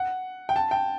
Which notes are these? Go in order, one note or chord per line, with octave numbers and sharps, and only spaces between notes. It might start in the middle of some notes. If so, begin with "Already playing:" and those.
Already playing: F#5
G5
A5
G5